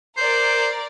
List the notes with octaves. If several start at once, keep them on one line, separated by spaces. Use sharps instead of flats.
A#4 C5 D5